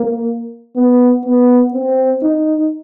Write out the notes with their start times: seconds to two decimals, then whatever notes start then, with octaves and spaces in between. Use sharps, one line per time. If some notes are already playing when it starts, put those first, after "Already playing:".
Already playing: A#3
0.76 B3
1.25 B3
1.74 C4
2.23 D#4